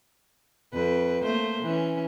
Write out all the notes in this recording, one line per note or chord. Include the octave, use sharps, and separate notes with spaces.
F2 B4
A3 A#3 C5
E3 C#4